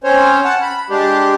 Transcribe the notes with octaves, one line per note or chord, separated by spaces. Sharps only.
C4 C#4 C5 C#5
F#5 A5
B5
G#3 D4 G4